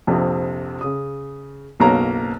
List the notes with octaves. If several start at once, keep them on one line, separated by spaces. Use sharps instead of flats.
A#1 F2 C3
C#3 D#6
F#1 B1 B2 A#3 C#5 A#5